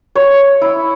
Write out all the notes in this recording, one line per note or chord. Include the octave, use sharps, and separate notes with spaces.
C#5
E4